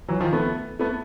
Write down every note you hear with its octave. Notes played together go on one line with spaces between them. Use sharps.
E3 F#3
D#3 F3
A3 B3
A3 B3